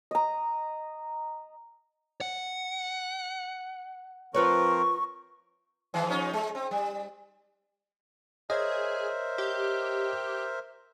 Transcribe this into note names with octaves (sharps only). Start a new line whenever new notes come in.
D#5 A#5
F#5
F3 C4 F4 A#4 B4 C#5 C#6
G#2 D#3 E3
F3 C#4 D#4
G#3
C4
G3
G#4 A#4 C5 C#5 D#5 E5
G4